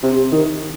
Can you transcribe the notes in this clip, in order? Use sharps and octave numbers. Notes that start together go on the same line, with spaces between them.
C3
D#3